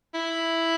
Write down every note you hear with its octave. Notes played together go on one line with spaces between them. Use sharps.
E4